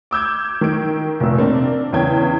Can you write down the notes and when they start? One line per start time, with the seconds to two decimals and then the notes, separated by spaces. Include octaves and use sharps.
0.11 D6 E6 G6 G#6
0.61 D#3 D7
1.20 F1 A#2 E6
1.38 A#3 C4 D4
1.93 E2 C#3 C#5 G5 G#6